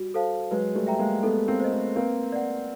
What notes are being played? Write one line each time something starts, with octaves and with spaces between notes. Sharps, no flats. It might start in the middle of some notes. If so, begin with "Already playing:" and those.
Already playing: G3 F#4
A4 C5 F5 A5
F#3 G#3 B4
G3 A3
E5 G5 A#5
G#3 A#3
A3 B3 A4
A#3 C4
C5 D#5
A3 B3
A#3 C4 B4
D5 F#5